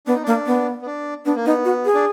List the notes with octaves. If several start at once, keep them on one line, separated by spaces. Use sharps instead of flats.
B3 D4
D#4
A#3 D4
B3
B3
D4
B3 D4
A#3
B3 D#4
F#4
G#4
D4